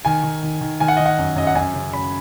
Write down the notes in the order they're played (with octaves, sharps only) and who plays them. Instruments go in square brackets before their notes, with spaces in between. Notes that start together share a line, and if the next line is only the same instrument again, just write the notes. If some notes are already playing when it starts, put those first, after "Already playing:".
[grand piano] D#3 G#5
D#3
D#3
D#3
D#3 G#5
F#5
D#3 D#5
F#5
F#2
F#2 D#5
F#5
F#2 G#5
C#3
F#2 B5